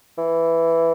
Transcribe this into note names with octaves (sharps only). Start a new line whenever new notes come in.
E3